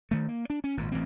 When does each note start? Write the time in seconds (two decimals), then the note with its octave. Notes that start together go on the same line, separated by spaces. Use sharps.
0.11 D#3 A3
0.28 A#3
0.50 D4
0.64 C#4
0.77 G#1 A#2
0.92 A1 B2 E3 C4